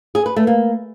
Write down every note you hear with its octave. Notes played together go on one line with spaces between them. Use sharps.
G#4
B4
A3
A#3